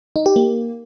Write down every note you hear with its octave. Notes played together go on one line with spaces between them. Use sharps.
D#4
G4
A#3